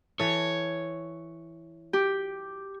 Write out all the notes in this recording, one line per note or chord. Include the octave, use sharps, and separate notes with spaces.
E3 A4 C#5
G4